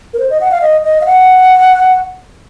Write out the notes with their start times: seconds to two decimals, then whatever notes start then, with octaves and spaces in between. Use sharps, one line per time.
0.14 A#4
0.19 C5
0.30 D#5
0.41 F#5
0.51 F5
0.62 D#5
0.83 D#5
1.01 F5
1.06 F#5